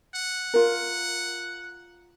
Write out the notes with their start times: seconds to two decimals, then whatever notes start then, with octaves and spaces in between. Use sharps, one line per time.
0.15 F#5
0.54 F4 A#4